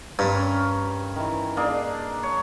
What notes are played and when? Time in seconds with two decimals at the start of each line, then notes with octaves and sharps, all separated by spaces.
0.19 G2 C4 A#4
0.35 C#4
1.16 D#3 E3
1.57 A#3 D4 G#4
2.23 C#5